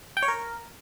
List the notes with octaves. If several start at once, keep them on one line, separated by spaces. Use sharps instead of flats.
G5
C#5
A#4